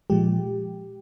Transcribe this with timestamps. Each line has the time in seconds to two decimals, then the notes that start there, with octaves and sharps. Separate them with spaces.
0.10 A#2 F3 G#3 G4